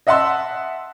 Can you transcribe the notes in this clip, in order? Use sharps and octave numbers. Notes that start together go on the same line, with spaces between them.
D#5 E5 F#5 A5 C6 E6